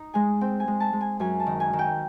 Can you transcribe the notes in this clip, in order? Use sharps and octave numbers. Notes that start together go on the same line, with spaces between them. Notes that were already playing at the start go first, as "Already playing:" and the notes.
Already playing: D#4
G#3 G#5
C4 G5
G#5
G#3
A5
G#3
G#5
F#2 G#5
A5
D#3
G#5
D#3
G5